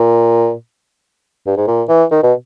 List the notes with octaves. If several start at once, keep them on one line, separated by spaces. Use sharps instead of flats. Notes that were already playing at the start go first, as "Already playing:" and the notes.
Already playing: A#2
G2
G#2
A#2
E3
D#3
B2